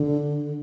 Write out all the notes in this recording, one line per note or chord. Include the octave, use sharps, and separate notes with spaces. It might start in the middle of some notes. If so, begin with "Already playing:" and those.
Already playing: D3